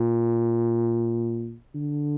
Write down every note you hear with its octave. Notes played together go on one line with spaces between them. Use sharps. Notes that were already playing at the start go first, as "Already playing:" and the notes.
Already playing: A#2
D3